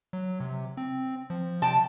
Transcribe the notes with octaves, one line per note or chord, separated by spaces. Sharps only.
F#3
C3
C4
F3
C3 G5 A5